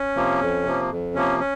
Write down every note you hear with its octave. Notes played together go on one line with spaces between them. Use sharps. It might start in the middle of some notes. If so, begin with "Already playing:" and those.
Already playing: C#4
C3 F3 A#3
F2
C3 F3 A#3
F2
C3 F3 A#3 C#4
C#4